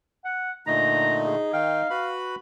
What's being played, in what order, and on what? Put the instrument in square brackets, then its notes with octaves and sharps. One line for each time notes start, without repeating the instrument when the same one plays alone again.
[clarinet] F#5
[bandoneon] A#2 D3 A3 [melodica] D#4 [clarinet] A#5
[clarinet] G#4
[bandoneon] D#3 G5 [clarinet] F5
[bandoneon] F#4 B4 B5